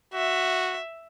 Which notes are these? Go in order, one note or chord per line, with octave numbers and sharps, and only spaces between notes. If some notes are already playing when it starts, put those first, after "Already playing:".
F#4 E5